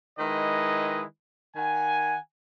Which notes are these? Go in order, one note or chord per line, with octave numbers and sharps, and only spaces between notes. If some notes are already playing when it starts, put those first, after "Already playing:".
D#3 G#3 E4 B4 D#5
D#3 F#5 G#5